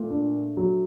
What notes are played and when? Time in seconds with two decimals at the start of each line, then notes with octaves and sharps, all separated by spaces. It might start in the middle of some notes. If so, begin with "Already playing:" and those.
Already playing: A#2 A3
0.10 D4
0.57 F#3